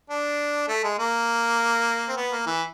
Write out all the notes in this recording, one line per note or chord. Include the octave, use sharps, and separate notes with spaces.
D4
A3
G#3
A#3
C4
B3
A#3
E3